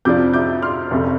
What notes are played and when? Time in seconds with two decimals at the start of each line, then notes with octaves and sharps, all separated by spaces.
0.05 F2 C3 F3 D4 F4 D6 G6
0.34 D6 G6
0.63 C6 F6
0.91 F1 F2 C3